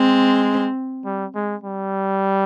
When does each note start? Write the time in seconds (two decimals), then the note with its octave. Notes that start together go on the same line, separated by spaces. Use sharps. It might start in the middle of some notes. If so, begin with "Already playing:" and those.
Already playing: G#3 C4
1.05 G3
1.35 G#3
1.64 G3